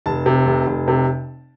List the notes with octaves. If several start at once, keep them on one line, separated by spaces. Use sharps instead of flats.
F1 A5
C3
F1
F1
C3